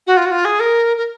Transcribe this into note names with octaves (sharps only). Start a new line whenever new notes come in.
F#4
F4
F#4
F4
G#4
A#4
A#4